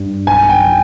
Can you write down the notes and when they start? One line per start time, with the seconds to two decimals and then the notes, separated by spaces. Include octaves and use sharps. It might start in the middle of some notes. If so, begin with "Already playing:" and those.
Already playing: G2
0.27 B1 G#5
0.49 G5
0.60 F#3